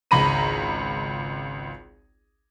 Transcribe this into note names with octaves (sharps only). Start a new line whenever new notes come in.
G#1 C#2 A#5 B5 A#6 D#7